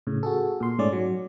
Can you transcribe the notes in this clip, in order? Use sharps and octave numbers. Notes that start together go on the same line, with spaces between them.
A2 C#3
F#4 G#4 A4
A#2 C6
G#2 A3 C#4 D5
F#3